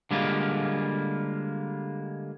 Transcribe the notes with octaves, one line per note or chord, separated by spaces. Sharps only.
D3 G3 G#3 A#3 F4